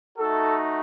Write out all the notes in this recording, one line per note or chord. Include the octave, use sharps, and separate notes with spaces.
A3 D#4 F#4 A4